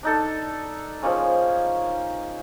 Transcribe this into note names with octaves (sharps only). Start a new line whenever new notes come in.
D4 D#4 A4
F3 G#3 A#3 C#4